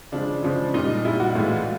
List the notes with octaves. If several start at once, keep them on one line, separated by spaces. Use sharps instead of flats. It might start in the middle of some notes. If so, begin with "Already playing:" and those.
C#3 F3 G#3 D4
C#3 F3 G#3
A#2 G3 D#4
A#2 G3 E4
F#4
A2 E3 G#3 F4